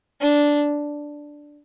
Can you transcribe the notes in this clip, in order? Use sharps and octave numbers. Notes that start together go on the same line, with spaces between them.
D4